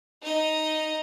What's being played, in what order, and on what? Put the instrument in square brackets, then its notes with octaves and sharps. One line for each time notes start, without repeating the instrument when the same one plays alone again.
[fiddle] D#4 D#5